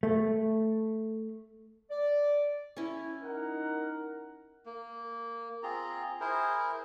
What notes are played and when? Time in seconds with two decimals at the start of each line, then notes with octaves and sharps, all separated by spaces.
0.03 A3
1.90 D5
2.77 C#4 E4
3.23 D#4 A#4 F#5
4.66 A#3
5.63 C4 F4 G#4 A#5
6.20 E4 G#4 A#4 C5